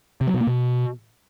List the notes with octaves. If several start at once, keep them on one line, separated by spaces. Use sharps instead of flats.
C3
F#3
B2
A#3
B2